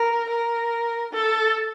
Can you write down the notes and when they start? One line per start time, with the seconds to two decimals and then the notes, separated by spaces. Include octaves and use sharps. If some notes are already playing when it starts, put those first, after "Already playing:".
Already playing: A#4
0.29 A#4
1.13 A4